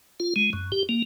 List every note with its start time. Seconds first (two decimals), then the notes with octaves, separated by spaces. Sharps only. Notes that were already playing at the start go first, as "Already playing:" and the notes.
0.20 F4
0.36 G#3
0.53 F#2
0.72 G4
0.89 A#3